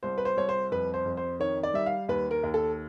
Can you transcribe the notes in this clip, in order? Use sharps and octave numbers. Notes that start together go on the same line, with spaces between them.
C2 C5
B4
C5
C2 C#5
C5
F2 B4
C5
F2
C5
D#3 C#5
D5
G3 E5
F5
D#2 B4
A#4
D#2
A4